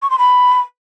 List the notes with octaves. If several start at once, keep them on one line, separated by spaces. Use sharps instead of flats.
C#6
C6
B5